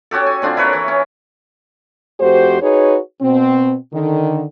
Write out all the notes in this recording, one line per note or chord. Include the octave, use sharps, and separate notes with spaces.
C#4 F#4 G4 A4
G#5
D3 C4 D4 F4
E4 A#4 B4 C#5
E3 C#5
C#4
F2 A3 F#4 G4 C5
D#4 F#4 G#4 B4 C#5
B2 C4
D3 D#3